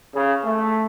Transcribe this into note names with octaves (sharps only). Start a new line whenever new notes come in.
C#3
A3